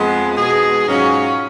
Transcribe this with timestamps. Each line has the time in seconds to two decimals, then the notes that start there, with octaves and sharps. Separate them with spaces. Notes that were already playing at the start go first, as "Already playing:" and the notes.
Already playing: F2 F3 G#3 B3
0.35 B2 G#3 D#4 G#4
0.86 G#2 F#3 C#4 F4